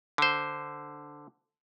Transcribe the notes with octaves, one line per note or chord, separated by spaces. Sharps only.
D3 C5